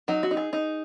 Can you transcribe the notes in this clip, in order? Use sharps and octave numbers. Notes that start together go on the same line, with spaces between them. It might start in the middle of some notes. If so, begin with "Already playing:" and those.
F#3 D#4
F#4
D#4
G#4
D#4